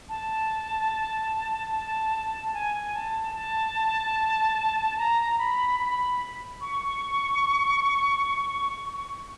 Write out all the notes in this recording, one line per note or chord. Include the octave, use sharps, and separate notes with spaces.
A5
A5
G#5
A5
A5
A#5
B5
B5
C#6